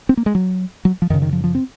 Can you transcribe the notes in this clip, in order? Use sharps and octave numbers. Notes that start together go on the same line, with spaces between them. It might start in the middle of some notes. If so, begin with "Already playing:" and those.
C4
A#3
G#3
F#3
F#3
F3
F#2 C#3 D#3
D#3
F3
F3
C4